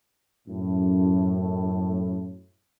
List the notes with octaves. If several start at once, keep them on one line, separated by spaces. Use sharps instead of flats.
F#2 A2